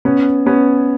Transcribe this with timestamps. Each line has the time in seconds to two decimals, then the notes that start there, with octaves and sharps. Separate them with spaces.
0.05 B3 C#4
0.46 B3 C#4